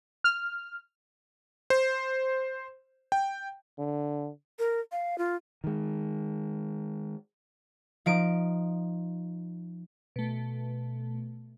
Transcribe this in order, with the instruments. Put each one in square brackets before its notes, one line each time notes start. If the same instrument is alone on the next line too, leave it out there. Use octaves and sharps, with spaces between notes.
[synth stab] F6
[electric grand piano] C5
G5
[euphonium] D3
[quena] A#4
F5
F4
[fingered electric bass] D#3 G#3
[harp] F3 D#4 D7
[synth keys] B2 A3